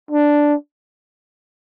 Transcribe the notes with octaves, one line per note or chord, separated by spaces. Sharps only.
D4